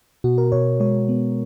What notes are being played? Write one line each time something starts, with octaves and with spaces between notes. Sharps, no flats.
B2 F#4
A#4
B2 C#5
G#3 C#5
B3